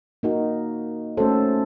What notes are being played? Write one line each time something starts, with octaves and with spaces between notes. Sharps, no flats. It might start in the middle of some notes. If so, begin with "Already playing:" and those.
A#3 D#4 F#4 A#4
A3 C#4 F#4 A4 C5